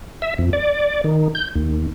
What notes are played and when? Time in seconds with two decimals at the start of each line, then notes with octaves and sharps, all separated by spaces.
0.22 E5
0.38 F2
0.53 D5
1.04 D#3
1.35 G6
1.55 D#2